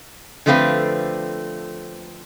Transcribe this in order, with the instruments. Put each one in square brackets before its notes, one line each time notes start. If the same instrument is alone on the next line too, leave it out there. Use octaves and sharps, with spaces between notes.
[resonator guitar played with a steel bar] D3 F3 A3 C4 B4 F5